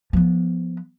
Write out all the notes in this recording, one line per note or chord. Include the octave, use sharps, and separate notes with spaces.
F3 B3